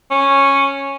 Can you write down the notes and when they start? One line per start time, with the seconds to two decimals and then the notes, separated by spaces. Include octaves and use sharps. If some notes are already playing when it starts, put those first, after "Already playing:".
0.11 C#4